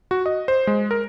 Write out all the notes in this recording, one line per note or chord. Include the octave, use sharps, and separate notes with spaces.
F#4
D#5
C5
G#3
A#4